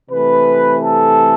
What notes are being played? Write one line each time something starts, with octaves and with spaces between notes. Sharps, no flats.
C3 E3 A3 B4
A4